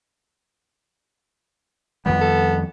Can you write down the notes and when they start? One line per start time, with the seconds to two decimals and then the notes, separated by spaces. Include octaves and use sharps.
2.06 F2 D#3 G3 B3
2.21 A4